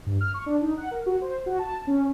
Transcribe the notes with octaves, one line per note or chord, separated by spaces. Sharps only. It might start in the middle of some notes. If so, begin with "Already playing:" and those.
G2
F6
C#6
D4
D#4
F#5
A#4
F#4
C5
F#4
A5
C#4